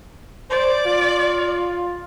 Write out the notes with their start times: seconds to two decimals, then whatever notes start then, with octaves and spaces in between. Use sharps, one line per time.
0.50 C5 D5
0.86 F4